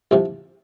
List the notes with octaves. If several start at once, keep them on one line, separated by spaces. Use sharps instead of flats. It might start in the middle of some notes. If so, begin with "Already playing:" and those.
C2 C3 F3